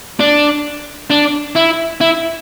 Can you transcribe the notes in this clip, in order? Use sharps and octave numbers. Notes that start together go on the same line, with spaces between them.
D4
D4
E4
E4